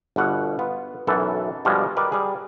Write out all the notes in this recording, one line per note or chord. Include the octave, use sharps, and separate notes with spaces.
G1 B2 F#5
B3 F4
B1 F#2 E3 A4
G2 B2 F3 G3 G#3
G4 A#4 B4 D5 D#5
G3 G#4